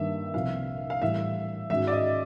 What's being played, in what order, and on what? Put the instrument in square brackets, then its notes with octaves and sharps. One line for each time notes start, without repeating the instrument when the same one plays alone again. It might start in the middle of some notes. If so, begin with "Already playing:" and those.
Already playing: [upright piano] G2 D#3 G3 A#3 [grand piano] E5
[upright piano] C2 A#2 F3 [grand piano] F5
[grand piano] F5
[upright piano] A2 E3 G3 [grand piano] E5
[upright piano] G#2 D#3 G#3 C#4 F#4 [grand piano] E5
[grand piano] D5
D#5